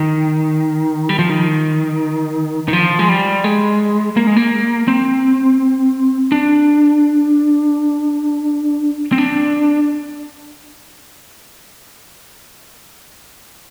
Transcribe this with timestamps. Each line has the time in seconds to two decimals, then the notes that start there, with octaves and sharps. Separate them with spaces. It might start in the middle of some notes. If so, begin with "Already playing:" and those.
Already playing: D#3
1.09 G3
1.19 F3
1.30 D#3
2.68 D#3
2.73 F3
2.99 G#3
3.09 G3
3.44 G#3
4.17 A#3
4.27 G#3
4.36 A#3
4.88 C4
6.32 D4
9.12 C4
9.18 D4